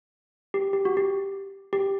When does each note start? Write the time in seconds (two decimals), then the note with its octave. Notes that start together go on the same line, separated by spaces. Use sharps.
0.54 G4
0.73 G4
0.85 F#4
0.97 G4
1.73 G4